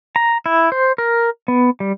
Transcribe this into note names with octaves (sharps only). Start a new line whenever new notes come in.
A#5
E4
C5
A#4
B3
G3